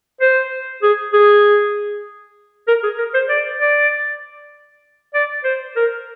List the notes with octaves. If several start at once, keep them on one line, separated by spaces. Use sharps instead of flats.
C5
G#4
G#4
A#4
G#4
A#4
C5
D5
D5
D5
C5
A#4